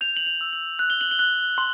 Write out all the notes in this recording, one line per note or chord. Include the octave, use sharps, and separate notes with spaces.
G6 F7
F#7
F7
E6
F#7
F#6
G7
F#7
G7
F#6
C6